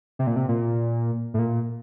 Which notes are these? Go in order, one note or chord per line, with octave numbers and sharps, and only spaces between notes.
C3
A#2
C3
A#2
A2
A#2